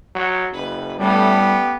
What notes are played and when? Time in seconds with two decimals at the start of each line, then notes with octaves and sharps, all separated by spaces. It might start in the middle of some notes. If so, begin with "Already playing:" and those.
0.15 F#3
0.53 F#1 B4
0.99 A2 G3 A3 B3 C#4 G4